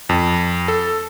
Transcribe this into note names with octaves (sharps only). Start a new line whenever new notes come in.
F2
A4